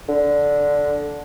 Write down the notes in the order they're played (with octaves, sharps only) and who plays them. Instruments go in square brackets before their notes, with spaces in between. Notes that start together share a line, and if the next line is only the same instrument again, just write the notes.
[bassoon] D3